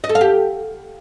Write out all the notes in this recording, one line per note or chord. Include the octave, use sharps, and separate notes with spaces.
D#5
A4
F5
G4